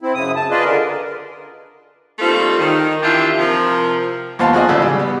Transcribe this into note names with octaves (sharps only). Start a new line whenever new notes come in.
C4 E4
F#2 C#3 D#6
A5
F4 G#4 B4 D5 D#5
D3 A#4
G3 A3 A#3 C4 D#4 F4
D#3
E3 D4 E4 F4 G4 E5
C3 F3 A#4
D#2 F3 B3 C5 F5 A5
F3 F#4 G#4 D5 D#5
A1 C#3 E6
G3
B3